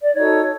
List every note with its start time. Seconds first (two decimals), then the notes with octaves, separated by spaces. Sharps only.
0.03 D5
0.14 D#4 F#4 A4 C#5